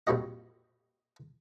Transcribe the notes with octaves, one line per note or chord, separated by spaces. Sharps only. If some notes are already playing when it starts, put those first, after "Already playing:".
A#1 F2 G3 F#4 D#5